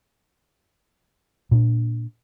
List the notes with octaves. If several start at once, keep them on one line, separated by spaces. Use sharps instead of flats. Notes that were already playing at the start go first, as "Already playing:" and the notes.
A#2 C#4 D4